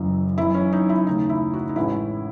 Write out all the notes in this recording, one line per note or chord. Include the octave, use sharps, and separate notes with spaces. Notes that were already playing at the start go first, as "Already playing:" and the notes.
Already playing: F#1 F#2 C#3 E3
F#1 F#2 E3 E4
C#4
D#4
E4
D#2 C#3 E3 A3 C#4 D#4
E4
F#4
D#4
A1 A2 G#3 C#4 E4